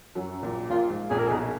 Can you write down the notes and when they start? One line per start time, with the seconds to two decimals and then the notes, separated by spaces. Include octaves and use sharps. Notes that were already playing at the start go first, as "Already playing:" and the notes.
0.15 F#2 F#3
0.43 A#1 A#2
0.70 A#1 A#2 F4
0.90 G#2
1.10 A#1 A#2 G#4
1.19 A#4
1.28 B1 B2 G#4